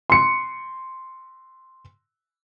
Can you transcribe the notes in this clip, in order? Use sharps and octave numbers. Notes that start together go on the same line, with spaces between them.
C6 C#7